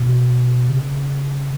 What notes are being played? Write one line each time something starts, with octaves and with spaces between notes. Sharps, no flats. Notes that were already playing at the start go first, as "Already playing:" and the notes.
Already playing: B2
C#3